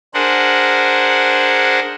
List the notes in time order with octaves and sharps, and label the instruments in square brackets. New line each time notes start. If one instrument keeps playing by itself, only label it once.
[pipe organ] D4 G#4 A#4 C5 F#5